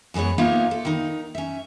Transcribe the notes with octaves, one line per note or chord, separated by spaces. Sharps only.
F#2 E3 G#3 B3 C#5
A#3 B3 D#4 F4 C#5 E5
A4
D#3 D#4
C#4 E5